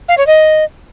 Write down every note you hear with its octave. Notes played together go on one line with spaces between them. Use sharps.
F5
C#5
D#5